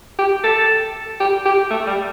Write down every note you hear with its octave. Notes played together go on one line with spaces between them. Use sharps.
G4
A4
G4
G4
A3
G3